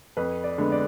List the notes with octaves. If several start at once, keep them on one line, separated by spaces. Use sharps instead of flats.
F2 B4
D5
D3 G#3 B3
D5